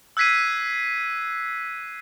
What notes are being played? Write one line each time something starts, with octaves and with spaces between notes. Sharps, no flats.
E6 F#6 G#6 B6 C7 D#7